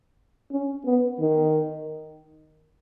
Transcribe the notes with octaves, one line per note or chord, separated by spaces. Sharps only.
C#4
B3
D#3